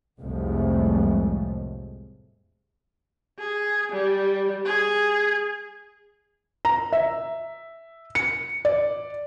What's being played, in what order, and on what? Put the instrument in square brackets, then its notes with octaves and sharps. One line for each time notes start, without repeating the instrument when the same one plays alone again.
[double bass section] C2 F2 A2 F3 G#3 A3
[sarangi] G#4
G3
G#4
[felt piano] A#5
E5
C#7
D5